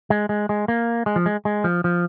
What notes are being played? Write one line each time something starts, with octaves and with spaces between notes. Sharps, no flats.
G#3
G#3
G#3
A#3
G#3
F3
G#3
G#3
F3
F3